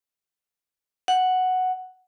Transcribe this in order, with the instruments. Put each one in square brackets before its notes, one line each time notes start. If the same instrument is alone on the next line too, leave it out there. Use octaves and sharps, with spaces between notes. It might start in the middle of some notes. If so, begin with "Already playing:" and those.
[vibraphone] F#5